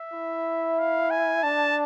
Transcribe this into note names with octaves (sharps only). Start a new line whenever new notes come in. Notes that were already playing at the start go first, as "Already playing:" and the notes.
Already playing: E5
E4
F5
G#5
D4 A5